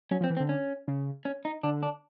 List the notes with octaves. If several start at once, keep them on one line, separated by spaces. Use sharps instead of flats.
F#3 C#4
F3
C4
E3
C4
D3
C#4
C#3
C#4
D#4
D3 D4
D4